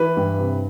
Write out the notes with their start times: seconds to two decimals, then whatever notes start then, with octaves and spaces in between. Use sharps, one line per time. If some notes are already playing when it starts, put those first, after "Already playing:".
Already playing: E3 B4
0.17 G2
0.38 C3